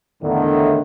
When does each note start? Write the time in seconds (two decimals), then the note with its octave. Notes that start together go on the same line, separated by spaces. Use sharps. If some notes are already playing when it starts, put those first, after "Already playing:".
0.22 E2 A2 D3 D#3